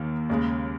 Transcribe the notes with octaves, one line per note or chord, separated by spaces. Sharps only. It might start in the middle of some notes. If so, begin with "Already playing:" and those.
Already playing: D#2 D#3 A#3
D#2 C#3 G#3